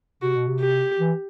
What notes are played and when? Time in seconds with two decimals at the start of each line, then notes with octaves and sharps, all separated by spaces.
0.22 C3 F#4
0.35 B2
0.47 C3
0.61 G4
0.99 E3